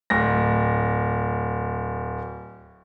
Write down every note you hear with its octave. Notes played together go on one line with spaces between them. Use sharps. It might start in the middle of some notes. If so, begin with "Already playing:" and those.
D1 A#6